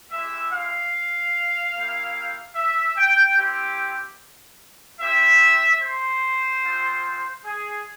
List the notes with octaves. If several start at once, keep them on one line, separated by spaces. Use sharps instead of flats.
G#3 E4 G4 E5
F5
A#3 E4 G4
E5
G5
C4 E4 G4
C4 E4 G4 E5
C5
G#3 C4 F4
G#4